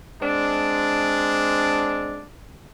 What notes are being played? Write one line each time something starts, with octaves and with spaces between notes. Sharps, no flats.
G#3 C4 D4